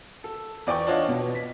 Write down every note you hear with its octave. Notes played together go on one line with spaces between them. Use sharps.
A4
E2 D5 G5 C#6
D4 D#4 F4 C#5 D#5 F#5
B2
B6